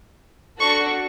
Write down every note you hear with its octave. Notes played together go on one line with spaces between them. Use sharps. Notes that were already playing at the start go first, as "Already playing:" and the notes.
D4 F#4 A4 C#6